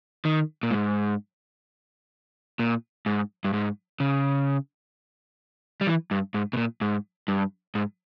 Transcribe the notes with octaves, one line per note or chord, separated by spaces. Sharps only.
D#3
A#2
G#2
A#2
G#2
G2
G#2
C#3
G3
E3
G2
G#2
B2
A#2
G#2
G2
G#2